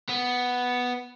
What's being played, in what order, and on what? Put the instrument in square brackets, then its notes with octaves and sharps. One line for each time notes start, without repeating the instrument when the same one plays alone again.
[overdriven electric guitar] B3